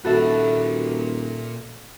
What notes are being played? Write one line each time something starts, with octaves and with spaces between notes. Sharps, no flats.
D#1 A#2 F#4 A4 E5 B5